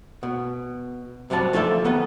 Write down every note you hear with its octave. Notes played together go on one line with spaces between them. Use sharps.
B2
F#2 C3 F#3 G3 A5
F3 A3 F4 A4 D5 E5
D#3 B3 A4 B4